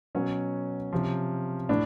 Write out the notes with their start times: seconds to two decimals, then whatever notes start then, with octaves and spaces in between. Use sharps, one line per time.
0.15 B2 F#3 C#4
0.92 C3 F3
1.69 A2 D4